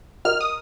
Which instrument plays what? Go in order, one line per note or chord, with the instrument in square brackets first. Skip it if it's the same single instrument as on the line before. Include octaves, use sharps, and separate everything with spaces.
[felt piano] A#4 D#5 [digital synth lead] F6
[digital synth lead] D#6